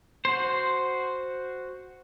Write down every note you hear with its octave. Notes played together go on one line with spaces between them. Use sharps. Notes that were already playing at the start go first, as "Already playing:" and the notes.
F#4 C5